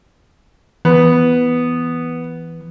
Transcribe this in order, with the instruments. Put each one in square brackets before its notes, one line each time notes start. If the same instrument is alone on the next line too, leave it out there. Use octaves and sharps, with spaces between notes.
[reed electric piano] E3 [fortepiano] B3